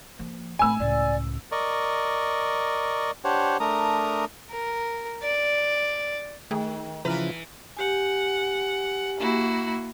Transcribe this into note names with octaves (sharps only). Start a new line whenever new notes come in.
F3 A#3
A1 A3 G#5 B5 E6
C#2 A2 D5
A#4 D5 D#5 C#6
D4 G4 C5 C#5 F#5
A3 D4 A#4 A#5 D#6
A#4
D5
D#3 A3 G#4
C#3 E3 F3 E4 B4 A#5 F6
G4 F#5 G#5
A#3 E4 F#4